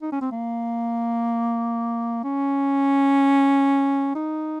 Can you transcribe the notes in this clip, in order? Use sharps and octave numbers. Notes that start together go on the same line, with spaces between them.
D#4
C#4
C4
A#3
C#4
D#4